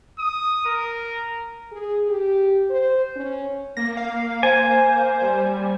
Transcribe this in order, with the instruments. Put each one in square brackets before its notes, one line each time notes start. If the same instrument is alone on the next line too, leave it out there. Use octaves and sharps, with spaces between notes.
[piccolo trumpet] D#6
A#4
[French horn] G#4
G4
C5
C#4
[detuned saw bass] A#3 [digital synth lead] A#6
[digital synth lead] F5
[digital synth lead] C5 [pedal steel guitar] G#5
[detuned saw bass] G3